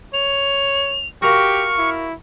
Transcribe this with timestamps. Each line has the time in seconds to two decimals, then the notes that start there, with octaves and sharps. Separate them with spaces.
0.14 C#5 F7
1.22 F#4 G4 A#4 F5 C#6 F6
1.78 E4